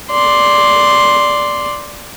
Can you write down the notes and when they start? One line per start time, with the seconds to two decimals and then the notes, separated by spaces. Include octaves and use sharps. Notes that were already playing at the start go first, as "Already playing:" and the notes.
0.11 D5 C6